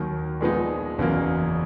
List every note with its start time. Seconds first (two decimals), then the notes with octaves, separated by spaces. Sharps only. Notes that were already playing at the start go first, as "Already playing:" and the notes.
Already playing: D#2 D#3 F#3 A#3
0.41 A#2 F3 G#3 B3 D#4
0.98 F#1 E2 C#3 F#3 A#3